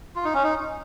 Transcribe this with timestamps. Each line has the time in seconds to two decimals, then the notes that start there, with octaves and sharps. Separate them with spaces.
0.16 F4
0.25 D#4
0.34 C#4
0.44 D#4